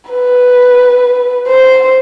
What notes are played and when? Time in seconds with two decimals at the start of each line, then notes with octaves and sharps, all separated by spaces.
0.10 B4
1.48 C5